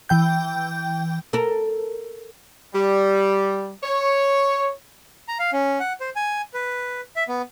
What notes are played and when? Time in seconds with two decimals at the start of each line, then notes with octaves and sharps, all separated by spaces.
0.09 E3 G5 G6
1.33 A4 A#4
2.74 G3
3.84 C#5
5.28 A#5
5.39 F5
5.53 C#4
5.80 F#5
6.00 C5
6.16 G#5
6.54 B4
7.16 E5
7.28 B3